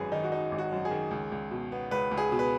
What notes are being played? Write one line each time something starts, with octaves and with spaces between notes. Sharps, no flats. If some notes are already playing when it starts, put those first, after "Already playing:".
Already playing: G#1 F#2 F#3 G#4 B4
D#3 D#4
F#4
F#3 D#4
G#1
F#4
F#2
G#4
D#3
C#2
C#2
B2
B3
C#2 B4
C#2
G#4
B2
B4